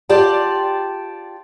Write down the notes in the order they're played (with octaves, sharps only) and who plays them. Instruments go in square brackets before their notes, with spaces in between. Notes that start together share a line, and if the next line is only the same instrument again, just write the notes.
[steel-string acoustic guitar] F4 G4 D5 A5